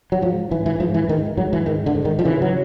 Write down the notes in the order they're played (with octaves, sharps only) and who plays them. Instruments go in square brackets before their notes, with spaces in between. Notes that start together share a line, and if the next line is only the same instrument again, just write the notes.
[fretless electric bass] F#3
G#2 F3
G#2 E3
E3
G#2 F3
E3
G#2 D#3
G#2 F#3
E3
G#2 D#3
D3
G#2
D#3
F3
C#3 E3
F#3